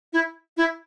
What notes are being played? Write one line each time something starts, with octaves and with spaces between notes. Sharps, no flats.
E4
E4